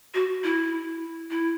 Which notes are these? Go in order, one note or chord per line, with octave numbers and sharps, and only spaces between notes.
F#4
E4
E4